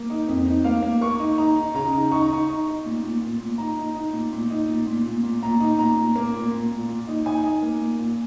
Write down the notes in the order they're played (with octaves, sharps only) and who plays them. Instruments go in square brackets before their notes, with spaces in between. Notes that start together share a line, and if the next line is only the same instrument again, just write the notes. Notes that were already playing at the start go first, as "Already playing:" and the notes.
Already playing: [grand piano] A#3
D#4
F2
D#4
A#3 F5
A#3
A#3 C#6
D#4
D#4 A#5
D#4
C#3 A#5
D#4
D#4 C#6
A#5
D#4 C#6
D#4
D#4
A#2
A#2
A#2
A#2
D#4 A#5
D#4
D#4
A#2
A#2
D#4
A#2
A#2
A#2
A#2
A#2 A#5
D#4
A#2 A#5
A#2
A#3
A#2
A#2
A#2
A#2
D#4
D#4 G#5
D#4
A#3
A#2
A#2